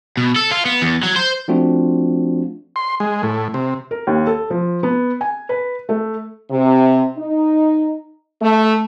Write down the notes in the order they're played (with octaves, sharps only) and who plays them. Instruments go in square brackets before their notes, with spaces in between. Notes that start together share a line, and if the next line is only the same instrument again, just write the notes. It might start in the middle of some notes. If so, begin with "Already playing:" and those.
[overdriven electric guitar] B2
A4
F4
B3
E2
F#3
C5
[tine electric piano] F3 A3 C4 D4 F4 F#4
[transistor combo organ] C6
G#3
A2
C3
[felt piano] A#4
D#2
A4
F3
B3
G#5
B4
A3
[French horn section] C3
D#4
A3